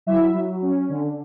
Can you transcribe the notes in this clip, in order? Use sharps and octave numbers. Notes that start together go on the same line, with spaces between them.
F#3 E4 E5
F#3
C#4
D3